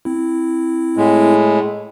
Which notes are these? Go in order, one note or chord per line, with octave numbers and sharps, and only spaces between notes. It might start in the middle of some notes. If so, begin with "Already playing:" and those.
C4 E4
A2 G#3